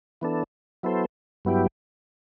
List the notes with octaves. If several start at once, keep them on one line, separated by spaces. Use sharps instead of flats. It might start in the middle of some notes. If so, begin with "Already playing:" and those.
E3 B3 D4 A4
F#3 B3 E4 A4 C5
G2 F#3 B3 E4 G4